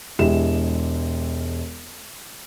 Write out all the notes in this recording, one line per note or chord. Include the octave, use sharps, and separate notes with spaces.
E1 G#3 E4 G4 E7